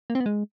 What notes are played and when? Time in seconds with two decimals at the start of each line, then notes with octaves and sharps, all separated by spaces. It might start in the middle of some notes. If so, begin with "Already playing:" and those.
0.10 A#3
0.15 C4
0.20 B3
0.26 G#3